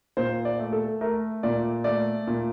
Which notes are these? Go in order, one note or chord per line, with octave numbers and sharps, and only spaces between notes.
A#2 C5
D5
A3
A4
A3 A#4
A#2 D5
A3 D5
A#2